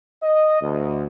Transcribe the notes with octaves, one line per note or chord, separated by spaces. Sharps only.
D#5
D2